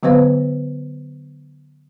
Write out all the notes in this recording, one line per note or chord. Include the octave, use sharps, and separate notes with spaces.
D3 F#3 B3 B4 C5 F5